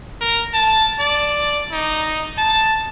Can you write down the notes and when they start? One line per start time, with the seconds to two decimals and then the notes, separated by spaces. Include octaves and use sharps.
0.21 A#4
0.54 A5
1.00 D5
1.72 D#4
2.38 A5